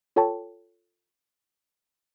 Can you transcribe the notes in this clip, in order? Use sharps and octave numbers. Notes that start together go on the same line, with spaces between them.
F4 A4 C#5 G5 A5 C#6